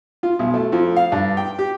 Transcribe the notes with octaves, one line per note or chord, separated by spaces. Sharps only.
F4
B1
A3
F2
F5
G2
G5
G4